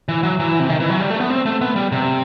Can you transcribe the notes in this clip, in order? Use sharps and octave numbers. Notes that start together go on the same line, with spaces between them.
E3
F#3
E3
C3
D#3
E3
F#3
G3
A3
B3
C4
A3
B3
G3
C3